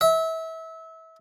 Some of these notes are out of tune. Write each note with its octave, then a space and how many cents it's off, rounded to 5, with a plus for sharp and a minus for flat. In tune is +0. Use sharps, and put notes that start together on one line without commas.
E5 -25